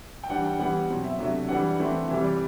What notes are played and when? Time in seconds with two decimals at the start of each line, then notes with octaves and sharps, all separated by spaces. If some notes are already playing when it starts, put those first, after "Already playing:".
0.24 G5
0.29 E3 G3 D4 F#5
0.44 G5
0.59 E3 G3 B3 F#5
0.89 B2 F#3 C4
1.04 E5
1.19 C3 F#3 A3 D4 E5
1.49 E3 G3 D4 F#5
1.79 E3 A3 C4
2.08 C3 E3 G3 E5
2.24 D5